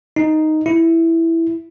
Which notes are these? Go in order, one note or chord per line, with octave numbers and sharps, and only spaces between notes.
D#4
E4